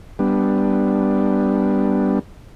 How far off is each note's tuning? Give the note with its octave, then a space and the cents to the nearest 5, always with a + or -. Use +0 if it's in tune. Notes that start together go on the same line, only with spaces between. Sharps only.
G3 +0 B3 +0 D4 +5